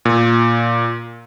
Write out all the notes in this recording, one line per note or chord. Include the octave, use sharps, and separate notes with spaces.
A#2